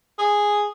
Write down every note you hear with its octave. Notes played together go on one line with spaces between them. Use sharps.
G#4